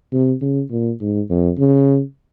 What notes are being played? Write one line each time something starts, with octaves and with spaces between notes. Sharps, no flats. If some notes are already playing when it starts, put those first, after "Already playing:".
C3
C#3
A#2
G#2
F2
C#3